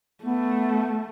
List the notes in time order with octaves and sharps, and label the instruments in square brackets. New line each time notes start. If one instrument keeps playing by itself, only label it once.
[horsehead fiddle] A3 [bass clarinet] B3